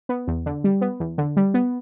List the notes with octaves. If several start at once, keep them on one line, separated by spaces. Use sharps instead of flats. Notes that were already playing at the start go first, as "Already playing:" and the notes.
B3
E2
D3
G3
B3
E2
D3
G3
B3